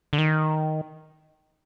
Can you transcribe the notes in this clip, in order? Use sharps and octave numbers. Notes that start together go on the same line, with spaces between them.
D3
D#3